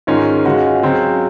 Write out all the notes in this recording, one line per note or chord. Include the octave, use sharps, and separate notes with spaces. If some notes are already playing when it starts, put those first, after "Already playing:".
G#2 D#3 G#3 C#4 F4
C#3 G#3 C#4 F#4
C#3 F#3 C4